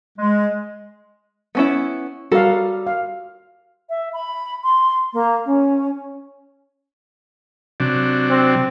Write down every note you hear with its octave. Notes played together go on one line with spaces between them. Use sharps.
G#3
B3 C#4 E4
G3 F#4 A4 A#4 F5
F5
E5
B5
C6
A#3
C#4
C3 F#3 D4
C4